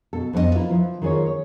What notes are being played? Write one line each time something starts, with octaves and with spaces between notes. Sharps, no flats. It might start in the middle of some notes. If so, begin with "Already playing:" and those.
B2 A4
F2 B3 D4 F#4 D#5
E4 F4 A#4 B4 E5
F3
D#3 F4 G#4 A#4 C#5
C#5